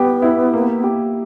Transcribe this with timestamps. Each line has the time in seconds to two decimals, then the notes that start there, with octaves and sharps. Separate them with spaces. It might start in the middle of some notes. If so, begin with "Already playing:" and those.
Already playing: G3 B3 G4
0.22 E4
0.54 A#3
0.84 G4